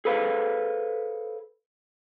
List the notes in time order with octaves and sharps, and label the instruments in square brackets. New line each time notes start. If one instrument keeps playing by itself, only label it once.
[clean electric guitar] G#4 A4 B4 C5 F5